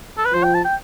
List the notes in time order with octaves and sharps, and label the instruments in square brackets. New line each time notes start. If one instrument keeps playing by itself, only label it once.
[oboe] A4
B4
[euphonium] F3 [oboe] C5
[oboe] G5
A5
G5